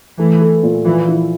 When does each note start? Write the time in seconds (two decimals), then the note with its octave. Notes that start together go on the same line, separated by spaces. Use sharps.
0.18 E3 A3
0.42 A4
0.63 A#2
0.85 E3 F3
1.08 E4